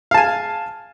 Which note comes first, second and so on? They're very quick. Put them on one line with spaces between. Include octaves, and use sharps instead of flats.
F5 A5 G#5